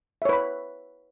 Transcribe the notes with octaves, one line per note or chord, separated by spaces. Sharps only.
B4 C#5 E5 B5